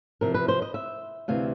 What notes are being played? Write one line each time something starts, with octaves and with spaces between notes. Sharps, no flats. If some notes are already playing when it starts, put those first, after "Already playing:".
E2 C3 F3 A#4
B4
C5
D#5
E5
D2 C3 E3 F5